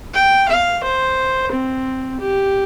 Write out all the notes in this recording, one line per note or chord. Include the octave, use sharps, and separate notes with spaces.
G5
F5
C5
C4
G4